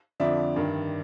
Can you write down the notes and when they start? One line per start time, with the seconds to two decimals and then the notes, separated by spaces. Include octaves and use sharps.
0.20 F2 D3 F3 D5 E5
0.56 G2 D#3